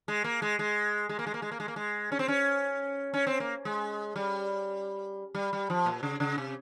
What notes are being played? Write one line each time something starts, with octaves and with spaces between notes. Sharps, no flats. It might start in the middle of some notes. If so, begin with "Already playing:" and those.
G#3
A#3
G#3
G#3
G#3
A#3
G#3
A#3
G#3
A#3
G#3
A#3
G#3
C#4
C4
C#4
C#4
C4
A#3
G#3
G3
G3
G3
F3
A#2
C#3
C#3
C3